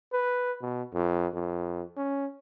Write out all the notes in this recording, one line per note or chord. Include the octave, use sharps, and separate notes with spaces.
B4
B2
F2
F2
C#4